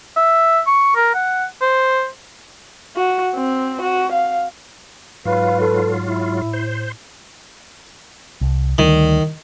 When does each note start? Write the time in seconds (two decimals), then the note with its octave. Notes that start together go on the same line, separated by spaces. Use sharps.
0.16 E5
0.67 C#6
0.96 A#4
1.14 F#5
1.62 C5
2.96 F#4
3.35 C4
3.82 F#4
4.13 F5
5.25 G#2 F#3 F4 B4 F5
5.61 A4
6.06 E4
6.37 A2
6.53 C5
8.41 C2
8.78 D2 D#3 G3